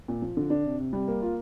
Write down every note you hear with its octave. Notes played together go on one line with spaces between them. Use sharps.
A#2
F3
D3
D4
C3
C3
G3
A#3
F4